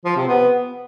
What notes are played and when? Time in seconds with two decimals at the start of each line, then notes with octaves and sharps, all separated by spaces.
0.05 F3
0.16 C3
0.28 B3